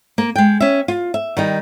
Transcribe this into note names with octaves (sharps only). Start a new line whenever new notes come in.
A#3
G#3 G5
C#4 E5
F4
E5
D#3 G3 D#4